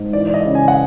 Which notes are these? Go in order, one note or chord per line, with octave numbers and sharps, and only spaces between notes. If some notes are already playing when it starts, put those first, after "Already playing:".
Already playing: G#2
E3 D5
D5
D#5
C#3
G#5
F#5